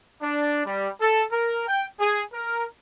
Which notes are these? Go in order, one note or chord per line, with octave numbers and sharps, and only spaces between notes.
D4
G3
A4
A#4
G5
G#4
A#4